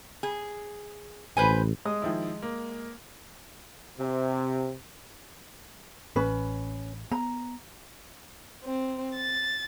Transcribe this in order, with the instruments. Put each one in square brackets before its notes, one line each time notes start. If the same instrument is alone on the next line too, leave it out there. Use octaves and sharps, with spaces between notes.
[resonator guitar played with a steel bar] G#4
[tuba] A1 [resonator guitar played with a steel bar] B4 C5 G#5
[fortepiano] G#3 D#6
[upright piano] D#3 F3 E4
A#3
[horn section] C3
[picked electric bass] A1 [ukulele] C#4 B4
[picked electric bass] B3 [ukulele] A#5
[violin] C4
A6